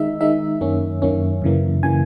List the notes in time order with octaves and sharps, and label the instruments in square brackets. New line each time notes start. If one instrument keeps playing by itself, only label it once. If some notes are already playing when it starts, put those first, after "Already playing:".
Already playing: [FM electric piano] D#3 G#3 D#4 E5
D#3 G#3 D#4 E5
F#2 D#3 A#3 C#4
F#2 D#3 A#3 C#4
F#2 C#3 E3 A#3
C#3 E3 A#3 G#5